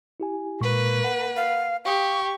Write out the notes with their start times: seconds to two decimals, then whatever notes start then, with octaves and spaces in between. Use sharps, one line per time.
0.20 E4 G4 G#5
0.61 A#2 G#3 A#3 B4 C#6
1.04 F#5
1.37 F5
1.85 G4 F5 C#6 D#6